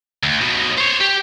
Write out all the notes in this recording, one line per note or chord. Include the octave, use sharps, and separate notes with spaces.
D2
D#2 B2
C5 C#5
G4